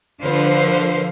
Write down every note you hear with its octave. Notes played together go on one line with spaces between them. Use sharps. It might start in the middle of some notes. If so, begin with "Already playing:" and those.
D3 F3 B4 C5 F5